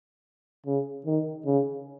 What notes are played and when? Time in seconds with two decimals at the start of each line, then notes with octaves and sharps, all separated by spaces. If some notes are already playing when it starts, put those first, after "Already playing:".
0.66 C#3
1.06 D#3
1.46 C#3